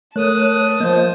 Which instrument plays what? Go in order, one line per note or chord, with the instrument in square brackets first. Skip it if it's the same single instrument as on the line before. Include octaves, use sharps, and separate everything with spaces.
[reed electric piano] A3 [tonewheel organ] A#4 C#5 F#6 [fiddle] A5 D#6
[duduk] F3 [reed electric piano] A#3 [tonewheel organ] D#5 G6